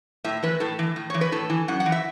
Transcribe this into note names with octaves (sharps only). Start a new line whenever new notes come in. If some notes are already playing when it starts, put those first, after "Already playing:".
A2 E5
E3 B4
A2 A4
E3
A2
E3 C#5
B4
A2 A4
E3
F#2 F#5
F#5
E3
E5